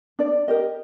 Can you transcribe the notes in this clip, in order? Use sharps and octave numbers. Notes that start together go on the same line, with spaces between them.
D4 D5
G4 A#4 D#5